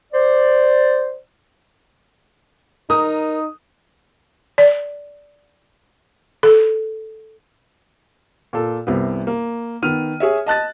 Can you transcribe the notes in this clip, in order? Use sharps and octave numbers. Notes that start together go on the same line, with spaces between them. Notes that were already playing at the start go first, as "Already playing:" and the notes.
C5 D5
D#4 A#4 D#6
D5
A4
A#2 A4
C2 C3 B3
A#3
D#3 B3 F6 D#7
G#4 C#5 E5
D#5 A5 F#6 A6